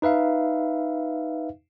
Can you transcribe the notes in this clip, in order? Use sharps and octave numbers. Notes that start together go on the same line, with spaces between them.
D#4 B4 E5 F5